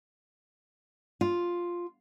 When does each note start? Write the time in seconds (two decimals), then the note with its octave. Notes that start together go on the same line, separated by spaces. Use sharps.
1.21 F4